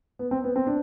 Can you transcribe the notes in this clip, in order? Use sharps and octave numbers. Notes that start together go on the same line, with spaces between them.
B3
C4
B3
C4
D4